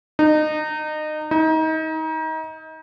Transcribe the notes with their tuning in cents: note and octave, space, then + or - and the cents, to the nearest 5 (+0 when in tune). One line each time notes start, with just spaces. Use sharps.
D#4 -25
D#4 +30